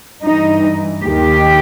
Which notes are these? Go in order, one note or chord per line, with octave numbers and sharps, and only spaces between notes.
G2 E3 D#4
D#2 D#3 G4